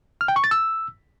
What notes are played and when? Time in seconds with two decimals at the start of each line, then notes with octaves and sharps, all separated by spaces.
0.21 F6
0.28 G5
0.36 C#6
0.44 A6
0.51 E6